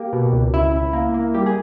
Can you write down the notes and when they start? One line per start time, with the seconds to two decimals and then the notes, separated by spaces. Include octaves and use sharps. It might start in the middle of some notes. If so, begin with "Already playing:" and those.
Already playing: A#3 G4
0.13 B2
0.33 C#2
0.54 C#2 E4
0.73 C#2
0.93 A#3
1.14 A#3
1.34 G3 G4
1.46 G#4